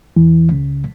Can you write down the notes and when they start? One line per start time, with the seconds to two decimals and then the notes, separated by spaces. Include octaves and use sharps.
0.17 E2 E3
0.52 C#2 C#3